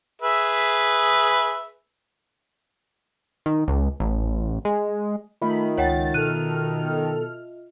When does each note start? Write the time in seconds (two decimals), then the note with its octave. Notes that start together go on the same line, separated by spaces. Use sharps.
0.22 G#4 B4 E5
3.46 D#3
3.68 C#2
4.00 A1
4.65 G#3
5.42 D#3 A3 F4 D#5 E5 B5
5.78 C#2 C#5 F#5 G5 A6
6.14 B2 A4 F6 F#6 D#7